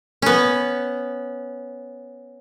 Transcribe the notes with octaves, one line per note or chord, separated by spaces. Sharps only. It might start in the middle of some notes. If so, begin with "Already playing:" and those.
B3 C#4